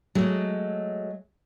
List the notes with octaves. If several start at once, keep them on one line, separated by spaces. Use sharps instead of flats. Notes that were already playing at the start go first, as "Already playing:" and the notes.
F#3 G#3 A3